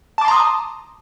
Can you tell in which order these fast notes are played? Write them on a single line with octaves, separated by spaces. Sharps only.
A5 D6 C6 A#5 D#6